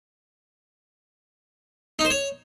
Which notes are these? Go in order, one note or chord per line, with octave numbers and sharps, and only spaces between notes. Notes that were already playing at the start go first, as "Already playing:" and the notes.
D#4
C5
C#5